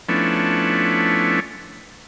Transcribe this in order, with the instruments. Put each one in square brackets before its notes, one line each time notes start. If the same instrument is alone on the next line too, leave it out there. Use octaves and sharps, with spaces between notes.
[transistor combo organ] F3 A3 B3 C#4 D4 E4